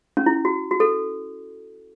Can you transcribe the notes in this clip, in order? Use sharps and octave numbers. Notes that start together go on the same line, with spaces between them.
C#4
E4
F#4
F#4
A4